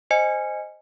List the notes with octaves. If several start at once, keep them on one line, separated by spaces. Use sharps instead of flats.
C5 D#5 G#5 C#7